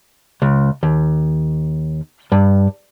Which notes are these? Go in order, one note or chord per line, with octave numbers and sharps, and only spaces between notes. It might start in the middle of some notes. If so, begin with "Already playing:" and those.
C#2
D#2
G2